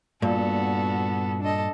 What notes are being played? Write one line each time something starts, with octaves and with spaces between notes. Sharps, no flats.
G2 A#2 B3 F#4 A4
D4 A4 D#5